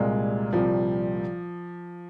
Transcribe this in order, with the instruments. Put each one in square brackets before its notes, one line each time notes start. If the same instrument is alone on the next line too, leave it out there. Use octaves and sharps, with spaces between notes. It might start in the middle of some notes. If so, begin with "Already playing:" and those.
Already playing: [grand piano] C2 A#2 G3 [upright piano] G#3
[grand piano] C2 A#2 G3 [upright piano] F3